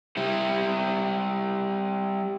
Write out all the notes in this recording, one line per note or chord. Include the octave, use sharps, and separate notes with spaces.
G3 E4